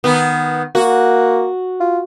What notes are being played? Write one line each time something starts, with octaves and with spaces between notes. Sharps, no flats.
D#3 B3
A#3 F#4
F4